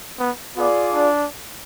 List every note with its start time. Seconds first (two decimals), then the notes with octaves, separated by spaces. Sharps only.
0.19 B3
0.57 B3 F4 G#4 D5
0.93 D4